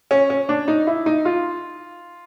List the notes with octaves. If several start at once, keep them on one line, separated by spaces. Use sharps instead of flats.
C#4
C#4
D4
D#4
E4
D#4
F4